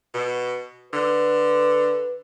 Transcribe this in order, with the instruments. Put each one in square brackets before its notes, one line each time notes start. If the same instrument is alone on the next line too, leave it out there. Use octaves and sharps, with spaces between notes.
[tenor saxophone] B2
[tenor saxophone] D3 [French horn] B4